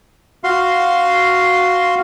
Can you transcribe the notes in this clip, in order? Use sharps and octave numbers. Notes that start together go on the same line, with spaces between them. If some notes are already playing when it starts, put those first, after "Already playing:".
F#4 F5 C6